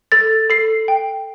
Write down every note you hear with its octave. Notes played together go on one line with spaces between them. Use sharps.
A4 A6
A4 C7
G5